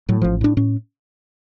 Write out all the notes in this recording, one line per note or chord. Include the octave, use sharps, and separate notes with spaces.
A2 F#3
A1 F3
A2 D4
A2 C#4